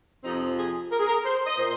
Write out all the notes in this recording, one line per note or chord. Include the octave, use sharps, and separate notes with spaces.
F2 C3 F3 C4 D#4
G#4
A#4
G#4
A#4
C5
D#5
A#2 A#3 C5